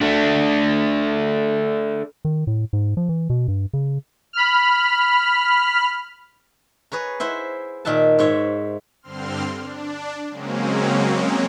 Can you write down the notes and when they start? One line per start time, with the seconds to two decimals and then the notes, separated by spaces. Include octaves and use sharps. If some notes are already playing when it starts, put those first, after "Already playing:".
0.01 A3 D4
2.25 D#3
2.47 A2
2.73 G#2
2.97 F3
3.09 E3
3.30 B2
3.48 G2
3.73 C#3
4.33 B5 F6
6.92 G#4 B4 C#5 A#5
7.20 E4 C5 E5 F#5
7.85 A#2 D#3 E5 F#5 A5
8.19 G#2 C5 C#5 E5
9.02 G2 D3 C4 C6 F6
9.58 D4
10.30 C#3 F#3 G#3 A#3 C4 C#4